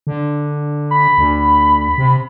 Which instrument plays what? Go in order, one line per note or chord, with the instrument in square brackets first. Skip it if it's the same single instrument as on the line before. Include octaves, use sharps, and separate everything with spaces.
[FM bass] D3
[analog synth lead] B5
[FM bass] D2
C3